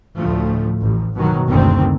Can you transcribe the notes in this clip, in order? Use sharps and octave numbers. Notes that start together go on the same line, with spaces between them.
D2 A2 F3 A3
A1
G2 B2 D#3 F#3
F#1 D2 B2 D3 D#3 C4